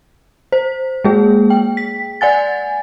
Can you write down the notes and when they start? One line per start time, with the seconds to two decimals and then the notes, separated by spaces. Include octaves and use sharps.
0.52 C5
1.04 G#3 A#3 G#4
1.50 G5
1.77 B6
2.21 D5 F#5 G#5 A6